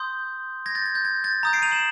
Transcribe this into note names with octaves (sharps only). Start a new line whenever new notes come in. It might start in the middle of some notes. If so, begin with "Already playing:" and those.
Already playing: C6 D#6 G6
G#6 A#6
G6 A6
G#6
G6
G#6
G6 A6
A#5 D#6 G6
C7 D7
D#7 F7
E7 F#7